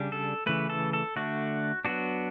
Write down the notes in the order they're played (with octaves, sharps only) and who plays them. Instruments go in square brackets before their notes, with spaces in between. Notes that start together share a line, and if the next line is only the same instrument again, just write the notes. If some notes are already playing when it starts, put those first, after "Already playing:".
Already playing: [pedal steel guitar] C#3 G3 D4
A4
C#3 E3 A3 B4
A4
A4
D3 A3 D4 F#4
F#3 B3 D4 F#4